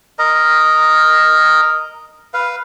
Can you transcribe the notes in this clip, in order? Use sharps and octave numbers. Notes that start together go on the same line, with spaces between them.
A#4 D#5 A#5
B4 F5